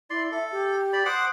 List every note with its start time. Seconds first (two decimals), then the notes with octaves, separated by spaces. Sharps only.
0.10 E4 D5 C6
0.32 A4 E5
0.52 G4
0.93 D5 B5
1.06 C5 F#5 D6 D#6